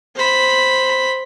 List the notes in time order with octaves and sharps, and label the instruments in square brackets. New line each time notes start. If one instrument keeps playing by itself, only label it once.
[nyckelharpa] C5 B5